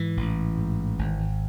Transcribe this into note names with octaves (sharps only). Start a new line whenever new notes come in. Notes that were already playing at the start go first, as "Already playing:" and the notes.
Already playing: G#2 E3
A1
G#2
G#1